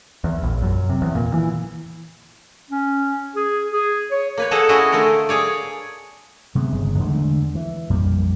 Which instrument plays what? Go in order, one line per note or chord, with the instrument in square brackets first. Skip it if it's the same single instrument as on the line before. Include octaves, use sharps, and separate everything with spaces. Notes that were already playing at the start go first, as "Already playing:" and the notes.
[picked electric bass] E2
A#1
F#2
C3
E2
A#2
E3
[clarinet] C#4
G#4
G#4
C#5
[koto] A#3 B4 C#5
G#4 A4 D#5 F#5 A5 A#5
C#4 E4 F#4 G#4 D#5
D3 A3 F4 A#4
G#4 C#5 D5
[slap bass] C3 G#3 B3
G1 C#3 G#3
E2 D3 G#3 A3
E3
A#1 F2 G3 A#3